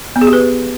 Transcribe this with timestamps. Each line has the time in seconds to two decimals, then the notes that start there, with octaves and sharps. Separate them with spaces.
0.16 B3
0.21 G#4
0.27 G4
0.33 B4